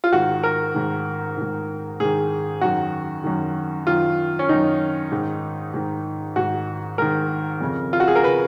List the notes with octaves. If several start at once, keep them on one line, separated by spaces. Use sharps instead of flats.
F4
G#2 D#3 F#4
A#4
G#2 D#3
G#2 D#3
G#2 D#3 G#4
F#2 D#3 F#4
F#2 D#3
F#2 D#3 F4
C#4
F#2 D#3 D#4
G#2 D#3
G#2 D#3
G#2 D#3 F#4
G#2 D#3 A#4
F2 C#3
F4
F#4
G#4
A#4
C#3 B4